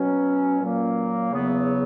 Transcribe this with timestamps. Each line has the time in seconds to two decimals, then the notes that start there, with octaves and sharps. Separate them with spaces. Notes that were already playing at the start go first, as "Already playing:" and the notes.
Already playing: B2 F#3 C#4
0.59 A#2 F#3 A#3
1.31 E2 C#3 F#3 B3